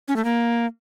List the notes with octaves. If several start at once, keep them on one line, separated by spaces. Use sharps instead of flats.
C#4
A3
A#3